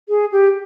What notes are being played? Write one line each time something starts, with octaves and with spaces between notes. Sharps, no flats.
G#4
G4